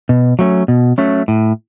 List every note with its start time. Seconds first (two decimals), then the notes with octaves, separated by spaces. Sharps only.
0.09 B2
0.39 F#3 A3 C#4
0.68 B2
0.98 F#3 A3 C#4
1.28 A2